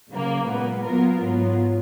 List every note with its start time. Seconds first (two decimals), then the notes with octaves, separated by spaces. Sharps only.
0.11 C#3 F#3 A#3
0.48 A#2 G#3 B3
0.85 F#3 B3 F4 A#4
1.22 G#2 F#3 B3 F4